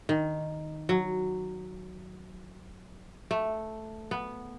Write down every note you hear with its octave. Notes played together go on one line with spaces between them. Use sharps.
D#3
F#3
A3
B3